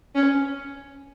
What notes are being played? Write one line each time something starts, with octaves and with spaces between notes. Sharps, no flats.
C#4